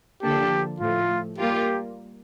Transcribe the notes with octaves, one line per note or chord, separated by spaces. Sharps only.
D3 F3 A#3 D4 G4 A4
A2 F3 A3 F4
G3 A#3 F4 G4 A#4